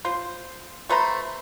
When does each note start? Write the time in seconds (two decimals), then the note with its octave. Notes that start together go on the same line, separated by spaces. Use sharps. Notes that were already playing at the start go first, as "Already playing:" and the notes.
0.05 F4 C5
0.90 A3 B4 C5 A#5